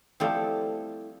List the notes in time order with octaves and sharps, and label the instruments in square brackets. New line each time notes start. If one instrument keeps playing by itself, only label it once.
[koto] F3 G3 C4 [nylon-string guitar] A3 E4 A4